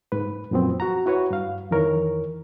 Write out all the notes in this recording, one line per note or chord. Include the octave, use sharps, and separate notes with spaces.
G#2 B4
F#2 A#2 F3 B3 C4
F#4 F#5 A#5
E4 F#4 B4 C#5
G2 F5
F2 D#3 E3 A#4 C#5